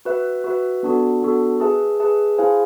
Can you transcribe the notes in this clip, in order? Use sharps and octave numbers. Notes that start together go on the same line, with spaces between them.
F#4 B4 E5
F#4 B4 E5
B3 D4 F#4 A4
B3 D4 F#4 A4
G#4 B4 E5 A5
G#4 B4 E5 A5
E4 G#4 C5 F5 G#5